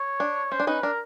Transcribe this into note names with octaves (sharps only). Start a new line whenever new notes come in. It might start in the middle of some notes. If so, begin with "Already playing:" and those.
Already playing: C#5
D4
C#4 C5
D4
C#4 D#4 B4
D4 A#4